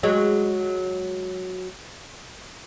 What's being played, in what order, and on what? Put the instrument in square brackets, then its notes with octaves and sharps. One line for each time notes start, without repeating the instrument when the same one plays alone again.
[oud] F#3 G#3